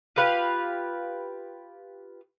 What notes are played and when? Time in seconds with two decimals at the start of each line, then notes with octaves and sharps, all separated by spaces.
0.16 F4 G4 B4 F5